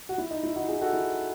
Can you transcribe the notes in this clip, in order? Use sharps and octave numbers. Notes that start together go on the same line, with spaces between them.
F#4
E4
D#4
E4
D#4 F#4
E4 G#4
F#4 A4
E4 G#4